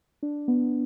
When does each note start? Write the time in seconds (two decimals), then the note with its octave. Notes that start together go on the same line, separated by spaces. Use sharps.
0.23 D4
0.48 B3